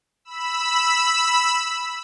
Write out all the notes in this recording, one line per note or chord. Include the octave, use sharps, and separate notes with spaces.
B5 E6